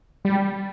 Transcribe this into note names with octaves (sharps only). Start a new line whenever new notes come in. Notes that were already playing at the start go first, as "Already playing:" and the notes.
G3